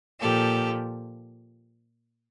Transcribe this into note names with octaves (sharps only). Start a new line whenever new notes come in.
A#2 F3 G4 A4